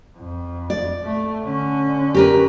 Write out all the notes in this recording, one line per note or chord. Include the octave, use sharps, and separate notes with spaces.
F2
D5
A3
D3 C#4
G4 A#4 B4